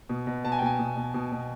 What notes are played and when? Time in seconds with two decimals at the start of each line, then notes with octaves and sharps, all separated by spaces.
0.09 B2
0.27 B2
0.44 B2 A5
0.52 G#5
0.59 G5
0.62 B2 G#5
0.79 B2
0.97 B2
1.14 B2
1.32 B2